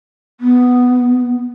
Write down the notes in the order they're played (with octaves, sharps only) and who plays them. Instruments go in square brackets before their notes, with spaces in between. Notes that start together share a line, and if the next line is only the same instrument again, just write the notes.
[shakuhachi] B3